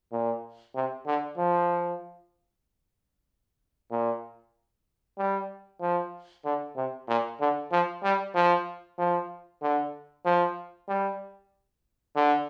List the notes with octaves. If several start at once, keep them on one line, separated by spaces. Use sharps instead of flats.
A#2
C3
D3
F3
A#2
G3
F3
D3
C3
A#2
D3
F3
G3
F3
F3
D3
F3
G3
D3